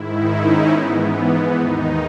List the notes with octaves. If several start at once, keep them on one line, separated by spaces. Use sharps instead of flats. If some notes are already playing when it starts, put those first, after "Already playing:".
Already playing: G#2 D#3 E4
D#4
C#4
G#2 E3 B3
D#2 D#3 D#4